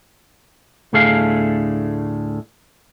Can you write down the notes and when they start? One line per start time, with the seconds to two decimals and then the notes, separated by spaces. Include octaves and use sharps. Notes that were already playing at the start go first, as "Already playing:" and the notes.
0.93 D2 A2 D3 A3 G#4 F5